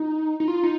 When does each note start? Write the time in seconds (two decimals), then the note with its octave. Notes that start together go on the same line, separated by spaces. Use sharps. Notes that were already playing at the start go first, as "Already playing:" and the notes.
Already playing: D#4
0.40 D#4
0.48 F4
0.63 D#4